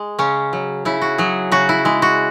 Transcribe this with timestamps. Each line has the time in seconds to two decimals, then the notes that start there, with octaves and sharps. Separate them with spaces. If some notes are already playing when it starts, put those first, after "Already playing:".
Already playing: G#3
0.19 C#3 C#4
0.53 F#3
0.85 C#3 E4
1.02 F#4
1.18 F#3 G#4
1.52 C#3 F#4
1.69 E4
1.85 G#3 E4
2.02 F#4